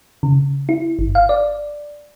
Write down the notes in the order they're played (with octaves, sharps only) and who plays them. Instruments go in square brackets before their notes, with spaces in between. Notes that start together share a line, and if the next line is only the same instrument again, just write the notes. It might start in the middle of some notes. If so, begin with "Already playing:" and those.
[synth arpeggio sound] C#3
E4
G1
F5
D5